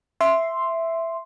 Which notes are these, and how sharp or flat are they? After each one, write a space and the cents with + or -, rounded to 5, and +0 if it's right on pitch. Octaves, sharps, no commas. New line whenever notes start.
E5 +5 C6 +0